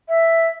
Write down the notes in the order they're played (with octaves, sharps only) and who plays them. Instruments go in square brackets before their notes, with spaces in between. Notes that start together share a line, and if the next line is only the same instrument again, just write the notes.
[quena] E5